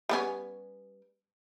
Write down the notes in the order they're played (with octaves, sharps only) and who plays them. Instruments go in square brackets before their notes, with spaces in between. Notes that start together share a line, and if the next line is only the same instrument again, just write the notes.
[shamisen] G3 B3 C#4